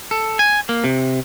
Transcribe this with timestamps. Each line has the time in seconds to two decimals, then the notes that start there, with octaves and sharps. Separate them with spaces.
0.11 A4
0.39 G#5
0.69 A#3
0.84 C3